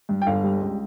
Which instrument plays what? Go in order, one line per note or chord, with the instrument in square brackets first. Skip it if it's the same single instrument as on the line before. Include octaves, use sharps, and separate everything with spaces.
[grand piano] G2
G5
G1 F5
G3
C#2